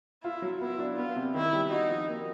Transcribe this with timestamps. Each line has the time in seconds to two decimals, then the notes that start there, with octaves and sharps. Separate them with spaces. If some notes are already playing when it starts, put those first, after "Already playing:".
0.23 E4 F4
0.42 F#3
0.60 B3 E4
0.79 D4
0.97 B3 F4
1.16 C3
1.34 D#3 E4
1.53 G3
1.71 D#4 F#4
1.90 F3
2.09 A#3